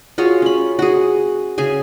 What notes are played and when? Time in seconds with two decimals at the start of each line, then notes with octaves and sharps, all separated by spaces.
0.18 F4 F#4 G#4 C#5
0.42 C#4 B5
0.79 F#4 G#4
1.58 C#3 G#4 G#5